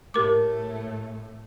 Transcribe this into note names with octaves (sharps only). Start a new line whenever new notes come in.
A2 A3 G4 A#4 D6